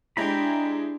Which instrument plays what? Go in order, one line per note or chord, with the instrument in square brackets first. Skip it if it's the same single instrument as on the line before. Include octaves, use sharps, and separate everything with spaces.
[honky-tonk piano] G#3 E4 G4 [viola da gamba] D4 [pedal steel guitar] G5 A#5 B5